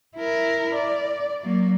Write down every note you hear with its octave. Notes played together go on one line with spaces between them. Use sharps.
E4 A#4
D5
F#3 A#3